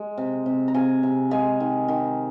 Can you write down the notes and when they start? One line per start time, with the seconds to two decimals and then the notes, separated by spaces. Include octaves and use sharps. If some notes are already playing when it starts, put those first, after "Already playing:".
Already playing: G#3
0.18 C3
0.46 C3
0.68 A#5
0.74 C3 F5 G#5
1.03 C3
1.31 G#3 F5 G#5
1.60 D#3
1.88 D#3